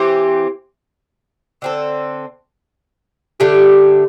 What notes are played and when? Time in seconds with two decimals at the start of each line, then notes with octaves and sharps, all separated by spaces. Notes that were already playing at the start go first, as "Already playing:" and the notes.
Already playing: E3 C4 G4
1.62 D3 C4 A4
3.40 D3 A3 D4 G4